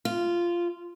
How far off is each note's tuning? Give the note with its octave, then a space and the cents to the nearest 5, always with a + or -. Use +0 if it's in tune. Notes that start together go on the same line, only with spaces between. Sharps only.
F4 -10